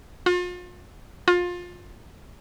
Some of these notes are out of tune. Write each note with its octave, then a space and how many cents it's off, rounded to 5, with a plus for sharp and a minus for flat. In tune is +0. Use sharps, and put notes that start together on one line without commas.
F4 +40
F4 +25